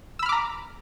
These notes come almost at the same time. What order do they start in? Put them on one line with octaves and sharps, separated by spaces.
E6 B5 F6 D6 A#5